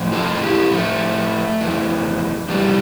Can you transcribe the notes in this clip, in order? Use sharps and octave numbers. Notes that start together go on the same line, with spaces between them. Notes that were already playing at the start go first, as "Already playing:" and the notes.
Already playing: A2 F3
F4 A4
E4 G4
A2 F3 A3
F2 E3
F2 E3 G3